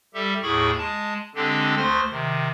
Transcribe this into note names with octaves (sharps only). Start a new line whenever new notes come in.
G3 G4 A4 E5
D#2 A2 E4 G#4 B5 C#6
G#3 A5
D3 G#3 C4 D4 G4 A4
D2 A3 C5 C6 F6 A#6
C3 D#3